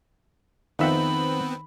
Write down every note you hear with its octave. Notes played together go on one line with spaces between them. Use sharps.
F2 D#3 B3 C4 D#4 E5 F#5 B5